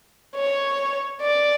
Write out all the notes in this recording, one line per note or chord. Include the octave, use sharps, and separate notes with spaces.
C#5
D5